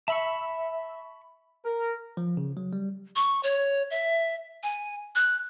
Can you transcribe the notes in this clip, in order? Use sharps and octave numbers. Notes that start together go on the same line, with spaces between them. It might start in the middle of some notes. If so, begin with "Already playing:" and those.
E5 A5 B5 C#6
A#4
F3
C#3
F#3
G3
C#6
C#5
E5
G#5
F#6